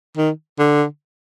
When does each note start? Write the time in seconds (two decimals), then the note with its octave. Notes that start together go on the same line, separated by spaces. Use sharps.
0.17 D#3
0.59 D3